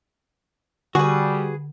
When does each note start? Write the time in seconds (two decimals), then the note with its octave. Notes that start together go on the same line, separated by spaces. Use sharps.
0.95 D3 G3 F#4 G#4 B4